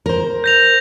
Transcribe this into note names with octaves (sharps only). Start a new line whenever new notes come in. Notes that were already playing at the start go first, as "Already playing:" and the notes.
A#4 C5
G6 A#6 F7